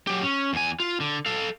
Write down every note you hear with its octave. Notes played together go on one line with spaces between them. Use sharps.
F#3 G4
C#4
E2 G#5
F4
D3
A4 F5